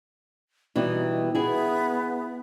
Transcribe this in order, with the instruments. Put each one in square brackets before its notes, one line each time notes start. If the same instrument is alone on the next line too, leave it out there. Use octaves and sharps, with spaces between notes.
[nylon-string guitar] B2 E3 G3 [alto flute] D#4
[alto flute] B3 [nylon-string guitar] E4 G#4